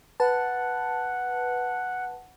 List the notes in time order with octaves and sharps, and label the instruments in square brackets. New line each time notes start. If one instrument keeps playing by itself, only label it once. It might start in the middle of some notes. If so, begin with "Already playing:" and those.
[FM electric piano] B4 A5 [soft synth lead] F#5